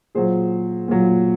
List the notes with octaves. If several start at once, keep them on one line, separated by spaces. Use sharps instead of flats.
A#2 F#3 G#4 C5
A#2 F#3